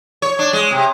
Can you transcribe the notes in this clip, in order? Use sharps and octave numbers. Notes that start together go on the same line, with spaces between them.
C#5
D4
G#3
C3